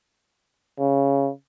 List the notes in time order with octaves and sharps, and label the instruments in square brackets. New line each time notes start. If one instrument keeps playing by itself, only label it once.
[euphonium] C#3